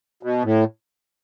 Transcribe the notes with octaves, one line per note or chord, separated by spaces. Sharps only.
B2
A2